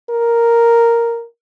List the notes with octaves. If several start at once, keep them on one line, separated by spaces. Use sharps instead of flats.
A#4